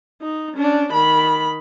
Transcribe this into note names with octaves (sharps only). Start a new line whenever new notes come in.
D#4
C#4 D4
D#3 B5